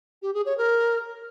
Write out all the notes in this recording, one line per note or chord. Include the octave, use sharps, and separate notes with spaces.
G4
G#4
C#5
A#4